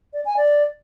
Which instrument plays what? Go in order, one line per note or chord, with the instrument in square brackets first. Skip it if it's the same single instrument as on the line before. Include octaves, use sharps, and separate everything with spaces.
[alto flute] D5
G#5
D5